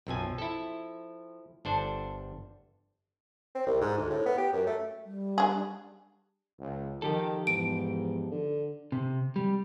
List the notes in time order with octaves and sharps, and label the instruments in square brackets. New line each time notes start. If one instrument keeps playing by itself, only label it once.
[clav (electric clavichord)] B1 F#2 G#5 [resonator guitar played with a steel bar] F3 C4 G5
[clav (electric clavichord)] E4 A4
[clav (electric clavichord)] G1 D4 C5 [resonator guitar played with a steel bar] A4
[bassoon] C4
C2
G#2
D2
A2
B3
G4
F#2
A3
[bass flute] G3
[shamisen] D4 G#4
[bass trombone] C#2
[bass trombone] D#3 [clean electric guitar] F3 G4 A4
[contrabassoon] E2 [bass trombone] G#2 [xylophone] D7
[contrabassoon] D3
[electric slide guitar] C3
G3